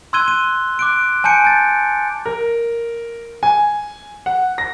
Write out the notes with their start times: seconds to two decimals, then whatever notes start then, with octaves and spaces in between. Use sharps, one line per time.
0.13 C6 E6 F#6 G#6 D#7 G7
0.28 D#7
0.79 D6 F#6 D7
1.24 G#5 A5 G6 C#7 D7
1.45 G6 A6
2.26 A#4
3.43 G#5
4.26 F#5
4.58 A#6